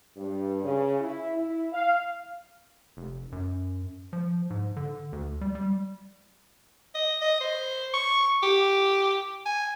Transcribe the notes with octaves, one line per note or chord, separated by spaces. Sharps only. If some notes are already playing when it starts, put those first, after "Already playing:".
G2
C#3
E4
E4
F5
F1
F#2
F3
G#2
D3
D2
G3
G3
D#5
D#5
C5
C#6
G4
G#5